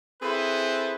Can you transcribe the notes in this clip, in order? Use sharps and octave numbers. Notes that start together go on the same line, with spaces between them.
C4 E4 G#4 A4 B4 C5